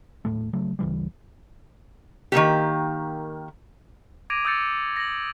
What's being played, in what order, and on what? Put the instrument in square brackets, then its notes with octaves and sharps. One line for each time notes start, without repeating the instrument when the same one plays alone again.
[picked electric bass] D#1 D#2 A2 A3
C#3 F#3 A3
D2 C#3 E3 G3
[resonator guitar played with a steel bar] D#3 E3 A#3 G4
[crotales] D6 G#6 A#6 D7 D#7 F7
D#6 E6 G6 A6 C#7
A#6 F#7